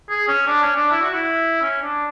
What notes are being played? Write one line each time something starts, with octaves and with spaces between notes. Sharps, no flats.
G#4
C#4
D4
C#4
D4
E4
F#4
E4
C#4
D4